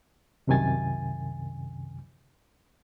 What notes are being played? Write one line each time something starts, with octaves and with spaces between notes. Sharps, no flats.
C2 F#2 C3 D#3 G#5 A6